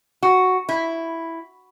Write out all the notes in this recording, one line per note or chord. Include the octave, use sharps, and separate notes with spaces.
F#4
E4